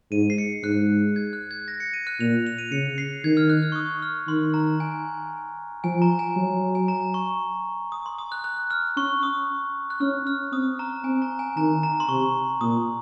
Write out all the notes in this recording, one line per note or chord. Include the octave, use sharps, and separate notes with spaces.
G#2 D#7
C7
C#7
G#2 F#6
G#6
F#6
G#6
A#6
C#7
D#7
F#6
A#2 F7
F7
D#7
C#3 C#7
C7
D#3 G#6
F6
F#6
F6
C#6
D#6
F6
D#3 C6
A#5
G#5
F3 G#5
A#5
G#5
F#3
G#5
A#5
C#6
D#6
C6
D#6
F#6
F#6
F6
C#4 C#6
D#6
F#6
C#4 F6
F6
C4 D#6
A#5
C4 G#5
A#5
G#5
D#3 A#5
A#5
C6
C3 C#6
A#2 D#6